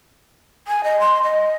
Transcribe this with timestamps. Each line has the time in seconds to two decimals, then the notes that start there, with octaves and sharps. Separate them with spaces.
0.68 G#5
0.84 D#5
1.00 C6
1.23 D#5